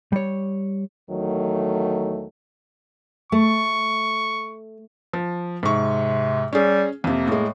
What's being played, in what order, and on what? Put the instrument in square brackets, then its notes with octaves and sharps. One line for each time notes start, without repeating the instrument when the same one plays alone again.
[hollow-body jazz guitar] G3 C#5
[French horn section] E2 D#3 F#3 A3
[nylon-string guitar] A3 [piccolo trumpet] C#6
[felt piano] F3
[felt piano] G#2 C#6 [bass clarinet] C3
[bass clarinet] G3 [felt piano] C#4 G#4
[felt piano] F2 C3 [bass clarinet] A#3
[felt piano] A2 G#3